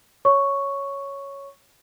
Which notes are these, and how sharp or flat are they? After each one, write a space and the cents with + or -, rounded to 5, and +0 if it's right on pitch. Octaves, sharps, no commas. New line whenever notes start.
C#5 +0 C#6 +0